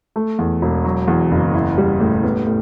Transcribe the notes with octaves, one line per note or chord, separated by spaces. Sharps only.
A3
E2
E1
F#3
E2
F#1
E4
G3
A2
B3
A2